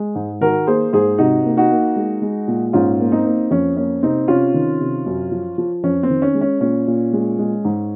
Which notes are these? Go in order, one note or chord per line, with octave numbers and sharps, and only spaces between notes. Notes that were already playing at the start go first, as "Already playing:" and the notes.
Already playing: G#3
G#2
D#3 F#4 A#4
A#3 G#4 C5
G#2 G#4 C5
C3 D#4 F#4
A#3
D#4 F#4
A#3
G#3
G#3
A#2
G#2 C#4 F4
A#3
C4 D#4
A#3
F2 C#4
A#3 C#4
C3 C4 D#4
C3 C#4 F4
D#3
C3
F#2
F3
F3
F2 C#4
C4
D#3
C#4
G#3
C#4
A#2 C#4
A#2
G#3
G#3
G#2